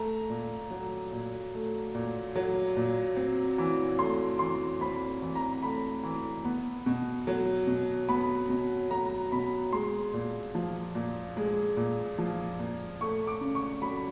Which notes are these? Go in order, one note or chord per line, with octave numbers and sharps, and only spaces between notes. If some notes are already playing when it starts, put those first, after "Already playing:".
Already playing: A3 A#5
A#2
F#3
A#2
A3
A#2
F#3
A#2
C4
E3
A3 C6
E3 C6
C4 B5
E3
A#5
A3 B5
E3
B3
B2
F#3
B2
B3 B5
B2
F#3 A#5
B2 B5
G#3 C6
A#2
F3
A#2
G#3
A#2
F3
A#2
A3 C#6
D6
C#3
C#6
F#3 B5